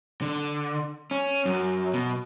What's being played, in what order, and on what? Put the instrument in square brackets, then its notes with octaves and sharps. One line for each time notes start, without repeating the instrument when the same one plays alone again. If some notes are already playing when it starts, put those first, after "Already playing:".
[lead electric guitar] D3
C#4
F#2
B2